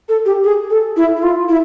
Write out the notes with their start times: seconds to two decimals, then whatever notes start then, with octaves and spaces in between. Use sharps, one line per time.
0.09 A4
0.25 G4
0.44 G#4
0.70 A4
0.96 E4
1.17 E4
1.23 F4
1.49 E4